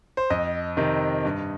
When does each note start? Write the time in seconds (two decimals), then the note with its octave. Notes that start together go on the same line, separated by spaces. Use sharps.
0.17 C5
0.30 F2 D#5
0.77 C3 D#3
1.25 G2